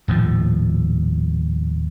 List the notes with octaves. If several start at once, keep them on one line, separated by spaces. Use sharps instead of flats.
D#1 A2 F3